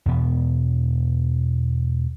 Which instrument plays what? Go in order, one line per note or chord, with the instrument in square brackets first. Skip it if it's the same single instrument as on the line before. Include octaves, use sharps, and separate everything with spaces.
[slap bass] E2 B2 B3